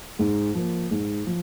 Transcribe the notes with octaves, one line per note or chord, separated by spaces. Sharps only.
G#2
F3 A#3
G#2
F3